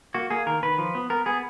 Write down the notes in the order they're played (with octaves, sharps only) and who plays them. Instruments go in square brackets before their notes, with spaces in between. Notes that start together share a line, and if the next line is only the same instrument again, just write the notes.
[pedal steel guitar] A#3 F#4
A#3 G#4
D#3 A#4
D#3 B4
F3
B3
B3 A#4
B3 G#4